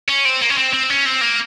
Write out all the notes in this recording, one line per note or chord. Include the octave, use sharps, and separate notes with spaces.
C#4
C4
A#3
C#4
C4
C4
C#4
C4
A#3